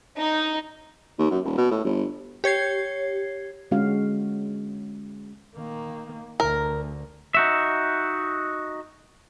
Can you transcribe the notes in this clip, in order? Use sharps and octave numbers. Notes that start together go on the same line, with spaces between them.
D#4
D#2
F#2
D#1
B2
A2
G1
G4 C#5 G#6 C7
D3 G#3 C#4 F#4 F5
D#3 A#3
D2 A#4
D#4 F#4 E5